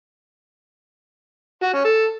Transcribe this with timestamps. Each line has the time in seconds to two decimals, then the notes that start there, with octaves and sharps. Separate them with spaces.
1.63 F#4
1.74 C#4
1.85 A4